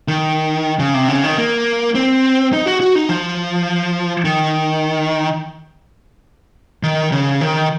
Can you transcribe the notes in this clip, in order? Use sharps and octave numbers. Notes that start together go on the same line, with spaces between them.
D#3
C#3
C3
C#3
D#3
A#3
C4
D#4
F#4
F#4
D#4
F3
D#3
D#3
C#3
D#3